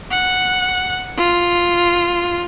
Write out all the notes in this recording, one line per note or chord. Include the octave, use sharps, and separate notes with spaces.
F#5
F4